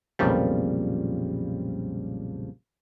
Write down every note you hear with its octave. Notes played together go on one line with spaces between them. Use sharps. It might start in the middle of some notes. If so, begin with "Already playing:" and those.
B1 F2 A#2 C#3 F3 G3